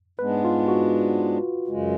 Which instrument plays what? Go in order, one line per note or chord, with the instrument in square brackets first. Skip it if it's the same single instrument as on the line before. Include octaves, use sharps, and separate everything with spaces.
[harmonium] G#2 G#3 B3 D4 [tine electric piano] B4
[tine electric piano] F4
F#4
[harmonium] F#2 C#3 G#3